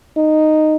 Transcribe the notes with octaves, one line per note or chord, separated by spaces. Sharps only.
D#4